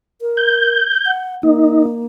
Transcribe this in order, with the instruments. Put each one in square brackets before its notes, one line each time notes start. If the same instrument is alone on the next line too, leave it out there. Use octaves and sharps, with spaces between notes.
[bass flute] A#4
[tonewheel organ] G6
[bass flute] F#5
[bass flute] A#3 [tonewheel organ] D#4